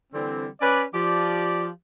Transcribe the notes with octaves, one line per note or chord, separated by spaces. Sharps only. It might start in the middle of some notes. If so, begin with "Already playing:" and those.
D3 E3 G3 C4
C#4 B4 D5
F3 G4 D5